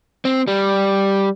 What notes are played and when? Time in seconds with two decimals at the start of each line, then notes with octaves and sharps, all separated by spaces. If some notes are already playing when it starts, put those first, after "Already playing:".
0.25 C4
0.48 G3